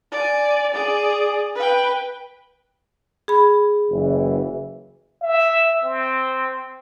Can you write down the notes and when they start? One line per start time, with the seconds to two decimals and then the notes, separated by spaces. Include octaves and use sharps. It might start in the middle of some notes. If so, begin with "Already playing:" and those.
0.12 D5 G#5
0.74 G#4 D5
1.56 B4 G5
3.28 G#4 B5
3.92 F#1 E3
5.23 E5
5.84 C4